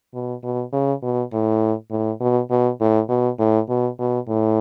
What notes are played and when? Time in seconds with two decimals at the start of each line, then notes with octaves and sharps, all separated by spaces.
0.14 B2
0.43 B2
0.73 C#3
1.02 B2
1.33 A2
1.91 A2
2.20 B2
2.50 B2
2.81 A2
3.09 B2
3.39 A2
3.69 B2
3.99 B2
4.28 A2